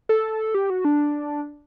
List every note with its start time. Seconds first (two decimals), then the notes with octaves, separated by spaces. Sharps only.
0.09 A4
0.55 G4
0.70 F#4
0.85 D4